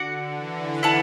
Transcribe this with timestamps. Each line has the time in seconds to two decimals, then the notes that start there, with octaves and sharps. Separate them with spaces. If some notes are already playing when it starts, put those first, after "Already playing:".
Already playing: D3 F#4 D5 F#5
0.35 E3
0.83 E4 B4 F#5 A5